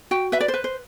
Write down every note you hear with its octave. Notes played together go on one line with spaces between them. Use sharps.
F#4 G5
B4 E5
D5
C5
B4
C5